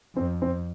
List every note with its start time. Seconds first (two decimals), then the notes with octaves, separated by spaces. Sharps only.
0.16 F2 C4
0.42 C4